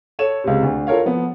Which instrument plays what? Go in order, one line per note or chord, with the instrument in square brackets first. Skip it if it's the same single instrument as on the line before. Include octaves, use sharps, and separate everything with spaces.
[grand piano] A4 C#5 E7
C#2 C3
D2
F4 A4 A#4 C#5 F5
F3 B3